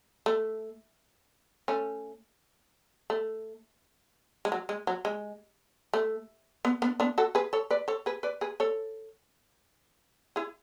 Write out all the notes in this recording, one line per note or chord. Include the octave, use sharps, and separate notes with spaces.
A3
A3 C#4
A3
G#3
F#3
G#3
F#3
G#3
A3
B3
B3 D4
B3 D4
F#4 A4
G#4 B4
A4 C#5
B4 D5
A4 C#5
G#4 B4
B4 D5
G#4 B4
A4 C#5
E4 G#4